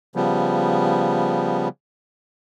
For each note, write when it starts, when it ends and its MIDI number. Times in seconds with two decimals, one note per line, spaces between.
0.15 1.68 49
0.15 1.68 53
0.15 1.68 55
0.15 1.68 59